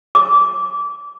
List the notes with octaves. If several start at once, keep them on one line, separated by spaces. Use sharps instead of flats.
D6